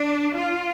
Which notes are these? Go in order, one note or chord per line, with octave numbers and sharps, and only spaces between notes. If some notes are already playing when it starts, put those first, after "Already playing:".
Already playing: D4
F4